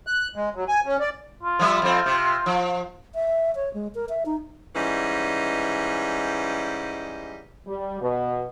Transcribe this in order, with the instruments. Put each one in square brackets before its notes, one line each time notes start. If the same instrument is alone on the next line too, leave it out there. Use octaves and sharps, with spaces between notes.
[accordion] F#6
G#3
F#3
G#5
C#4
D5
[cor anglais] F4
[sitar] F3 G3 E5
F2 C4
C3
F3
[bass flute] E5
C#5
G#3
A#4
E5
D#4
[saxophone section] G#2 E3 G3 C#4 D#5
[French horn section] G3
B2